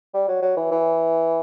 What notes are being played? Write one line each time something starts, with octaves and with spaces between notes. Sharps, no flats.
G3
F#3
F#3
E3
E3